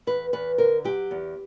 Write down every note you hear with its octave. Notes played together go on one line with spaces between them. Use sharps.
E2 B4
E2 B4
D3 A#4
F#3 G4
E2